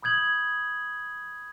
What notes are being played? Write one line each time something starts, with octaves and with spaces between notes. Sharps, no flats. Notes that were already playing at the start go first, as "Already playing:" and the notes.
B5 D#6 G6 G#6 F#7